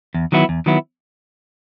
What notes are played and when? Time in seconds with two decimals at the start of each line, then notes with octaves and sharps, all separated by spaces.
0.14 E2
0.32 D#3 F#3 B3 E4
0.49 E2
0.66 D#3 F#3 B3 E4